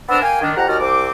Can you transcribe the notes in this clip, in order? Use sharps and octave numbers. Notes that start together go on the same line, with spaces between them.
B3 C4 D4 A#4 D5 E6
A#3 F5 G5 G#5
D#3 D4
F2 G4 F#5 A#5
D#2 D#4 F#4 D5 A5 F6
C2 C4 D6